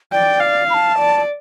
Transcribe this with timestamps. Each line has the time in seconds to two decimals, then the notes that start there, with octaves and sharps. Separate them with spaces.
0.12 D5 G5
0.40 F5
0.70 B5
0.74 A5
0.99 D5